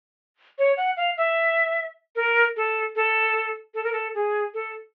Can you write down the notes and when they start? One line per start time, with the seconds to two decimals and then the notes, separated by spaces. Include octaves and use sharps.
0.58 C#5
0.77 F#5
0.97 F5
1.17 E5
2.16 A#4
2.57 A4
2.96 A4
3.74 A4
3.84 A#4
3.93 A4
4.15 G#4
4.54 A4